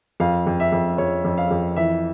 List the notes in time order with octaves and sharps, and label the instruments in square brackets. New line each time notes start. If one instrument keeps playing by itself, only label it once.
[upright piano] F2 F5
F2
E5
F2
F2 C#5
F2
F5
F2
E3 E5